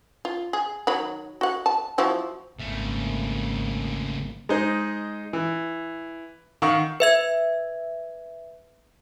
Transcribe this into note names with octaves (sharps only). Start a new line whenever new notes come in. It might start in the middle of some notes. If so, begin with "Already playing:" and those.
F4
G#4
D#3 F#3 B5
F#4 F#5
A5
F3 F#3 E4
G#1 C#3 A3 A#3
G#3 D#4 C5
E3
D#3 F5 F#5 C#6
B4 E5 G#6